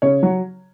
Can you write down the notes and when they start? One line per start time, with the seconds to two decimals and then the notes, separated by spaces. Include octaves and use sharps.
0.02 C#3 C#5
0.23 F#3